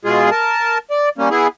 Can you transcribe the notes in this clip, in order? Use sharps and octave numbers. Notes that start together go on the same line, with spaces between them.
B2 G#3 F4 G#4
A#4 A5
D5
G3 A#3 C#4
B3 E4 G#4